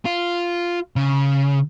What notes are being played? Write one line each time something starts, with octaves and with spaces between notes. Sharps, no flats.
F4
C#3